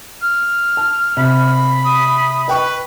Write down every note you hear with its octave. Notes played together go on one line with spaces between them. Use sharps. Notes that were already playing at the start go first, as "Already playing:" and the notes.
F6
A5
C3 B5
D#6
B4 D#5 G5 C#6